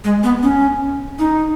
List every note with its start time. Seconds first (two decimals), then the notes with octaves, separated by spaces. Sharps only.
0.04 G#3
0.23 B3
0.43 C#4
1.19 D#4